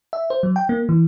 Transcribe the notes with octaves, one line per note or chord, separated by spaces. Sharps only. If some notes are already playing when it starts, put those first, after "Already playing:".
E5
C5
F#3
G5
A#3
E3